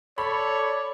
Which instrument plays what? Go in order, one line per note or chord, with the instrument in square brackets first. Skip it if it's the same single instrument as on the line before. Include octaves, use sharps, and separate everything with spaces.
[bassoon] A4 [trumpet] C#5 [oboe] D5 [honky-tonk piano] B5